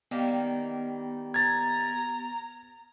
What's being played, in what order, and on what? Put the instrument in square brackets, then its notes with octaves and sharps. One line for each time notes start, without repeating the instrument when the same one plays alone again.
[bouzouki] D#3 G3 A#3 [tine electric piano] B3
[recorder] A#5 [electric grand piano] G#6 A6